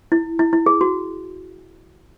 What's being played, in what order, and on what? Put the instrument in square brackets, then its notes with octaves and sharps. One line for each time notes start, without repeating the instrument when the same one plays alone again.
[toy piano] E4
E4
E4
G#4
F#4